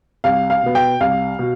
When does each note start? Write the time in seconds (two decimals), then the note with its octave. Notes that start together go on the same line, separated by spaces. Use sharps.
0.24 C2 F5
0.50 F5
0.63 B2 B3
0.75 G5
1.00 C2 F5
1.39 B2